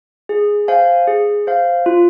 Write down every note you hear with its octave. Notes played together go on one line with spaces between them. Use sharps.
G#4
C5 F5 G#5
G#4
C5 F5
F4